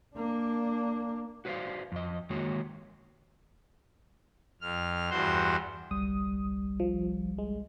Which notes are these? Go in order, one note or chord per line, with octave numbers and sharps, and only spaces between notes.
A#3 D4
F#4 B4 C5 D5 F5
F2 D#5
D#3 G#3 A#3 F#4 C#5
F2 F6
E2 G2 F#4 C5 C6
G1 C2 G3 D#6
F3
G#3